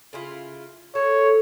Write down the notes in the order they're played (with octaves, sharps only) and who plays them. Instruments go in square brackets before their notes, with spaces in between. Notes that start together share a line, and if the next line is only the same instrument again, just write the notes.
[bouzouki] C#3 E4 F4
[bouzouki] A4 [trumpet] C#5